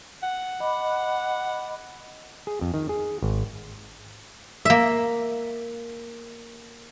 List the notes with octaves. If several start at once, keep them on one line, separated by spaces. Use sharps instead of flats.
F#5
D#5 B5 D6
G#4
F2
D#3
G#4
G#1
A#3 E5